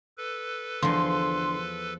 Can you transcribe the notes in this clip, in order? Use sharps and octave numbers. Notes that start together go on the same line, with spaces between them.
A4 B4
E2 D3 F3 C6